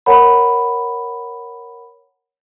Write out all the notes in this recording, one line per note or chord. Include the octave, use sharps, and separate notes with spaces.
A#4 C#5 F#5 A#5 B5